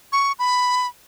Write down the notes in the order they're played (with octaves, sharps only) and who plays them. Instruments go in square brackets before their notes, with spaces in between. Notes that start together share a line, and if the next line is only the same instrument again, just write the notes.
[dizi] C#6
B5